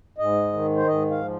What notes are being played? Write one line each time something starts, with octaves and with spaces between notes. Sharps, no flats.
G#2 D#5
D#3
C5
G#2 D#5
F5
F3